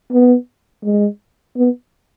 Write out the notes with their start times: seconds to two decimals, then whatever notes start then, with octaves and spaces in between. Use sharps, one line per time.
0.12 B3
0.84 G#3
1.57 B3